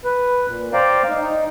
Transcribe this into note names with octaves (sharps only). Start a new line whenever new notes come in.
B4
A#2
C5 D5 F5 G5 A#5
D#4
D#4